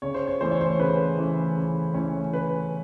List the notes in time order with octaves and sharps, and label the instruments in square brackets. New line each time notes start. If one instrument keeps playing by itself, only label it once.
[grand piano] C#3 C#5
C5
C#5
E3 A3 C#4 C5
C#5
C5
C#3 B4
E3 A3 C#4
C#3
E3 A3 C#4
C#3 B4